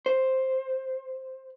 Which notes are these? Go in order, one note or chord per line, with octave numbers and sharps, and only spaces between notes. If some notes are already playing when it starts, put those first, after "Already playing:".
C5